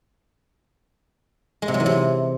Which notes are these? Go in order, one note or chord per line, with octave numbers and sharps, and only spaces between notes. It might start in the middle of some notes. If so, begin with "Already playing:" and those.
G#3
C3
F#3
E3
C3